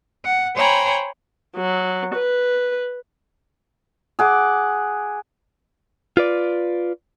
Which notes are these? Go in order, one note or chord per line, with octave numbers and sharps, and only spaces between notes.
F#5
C5 C#5 G5 G#5 A#5 B5
F#3
B4
G#4 F#5 D6
F4 B4 D5